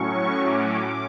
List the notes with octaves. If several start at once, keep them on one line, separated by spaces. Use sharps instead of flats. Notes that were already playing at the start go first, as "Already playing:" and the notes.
Already playing: A2 F#3 C#4 C#6
D6